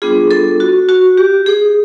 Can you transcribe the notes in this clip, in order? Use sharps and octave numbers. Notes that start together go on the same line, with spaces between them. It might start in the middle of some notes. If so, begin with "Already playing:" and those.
G3 B3 D4 F4 G#4
A4
F#4
F#4
G4
G#4